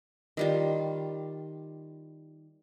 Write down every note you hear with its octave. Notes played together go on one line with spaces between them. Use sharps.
D#3 G3 F4